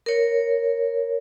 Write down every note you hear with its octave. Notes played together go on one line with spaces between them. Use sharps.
A#4 C#5